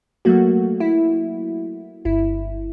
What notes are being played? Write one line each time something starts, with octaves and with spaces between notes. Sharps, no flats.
F#3 A3 A#3 F#4
E4
G1 E4